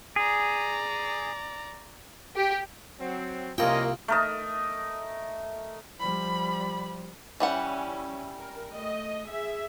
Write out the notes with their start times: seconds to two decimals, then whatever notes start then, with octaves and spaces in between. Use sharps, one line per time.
0.16 G#4 D5 A#5
2.35 G4
2.99 F#3 C4
3.58 C2 A#3 C#4 F4 A#4 D#5 G5
4.08 A3 A#4 D#5
6.00 F3 G3 B5
7.40 E3 G3 C#4 E4 F#5
8.38 A#4
8.71 A3 D#5
9.29 G#4 E5